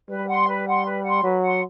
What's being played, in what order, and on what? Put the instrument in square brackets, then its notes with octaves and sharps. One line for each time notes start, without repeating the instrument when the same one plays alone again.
[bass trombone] G3 [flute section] B4
[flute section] F#5 C6
B4
F#5 C6
B4
F#5 C6
[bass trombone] F#3 [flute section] B4
[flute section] F#5 C6